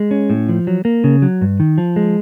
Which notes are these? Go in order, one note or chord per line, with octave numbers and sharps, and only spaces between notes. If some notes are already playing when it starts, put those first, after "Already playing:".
Already playing: G#3
C#4
A2
F3
F#3
A#3
C#3
F#3
G2
D#3
F3
G#3